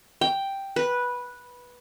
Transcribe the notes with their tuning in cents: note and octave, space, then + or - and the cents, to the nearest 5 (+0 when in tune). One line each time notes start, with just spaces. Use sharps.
G5 +0
B4 -10